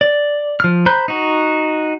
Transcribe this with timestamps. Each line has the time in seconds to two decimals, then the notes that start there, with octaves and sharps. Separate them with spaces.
0.01 D5
0.60 F3 F6
0.86 C5 A#5 B5 F#6 G6
1.08 D#4 F#4